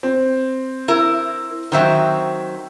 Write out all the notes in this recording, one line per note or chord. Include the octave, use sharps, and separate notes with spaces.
C4
E4 A#4
D#3 F#3 C4 C5 E5